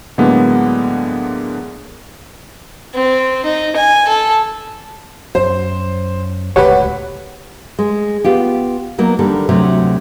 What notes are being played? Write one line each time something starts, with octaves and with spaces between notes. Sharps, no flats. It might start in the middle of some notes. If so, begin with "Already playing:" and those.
A2 D3 F#3 G#3 A#3 B3
C4
D#4
G#5
A4
F#2 F#3 C5
D1 C#2 D3 G4 B4 C#5 F#5
G#3
B3 F4 G4
F#3 A#3 B3 D#4
D3 D#3 G3 A4
D2 C3 F#3 A3